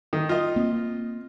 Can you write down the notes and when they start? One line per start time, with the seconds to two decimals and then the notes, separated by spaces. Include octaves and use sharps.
0.13 D#3
0.29 F4 D#5
0.56 A#3 C4